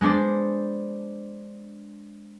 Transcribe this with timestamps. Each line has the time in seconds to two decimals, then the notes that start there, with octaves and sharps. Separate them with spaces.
0.01 G#3 B3 D4 C5 D5